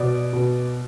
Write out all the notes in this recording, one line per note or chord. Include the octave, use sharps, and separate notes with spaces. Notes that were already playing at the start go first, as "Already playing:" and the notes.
Already playing: B2 D5
B2